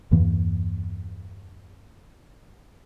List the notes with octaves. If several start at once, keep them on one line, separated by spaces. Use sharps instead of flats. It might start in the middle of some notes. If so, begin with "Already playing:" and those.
E2 G2 E3 A#3